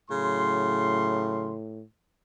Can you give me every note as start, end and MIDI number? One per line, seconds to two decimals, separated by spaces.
0.10 1.83 45
0.10 1.53 49
0.10 1.53 54
0.10 1.53 84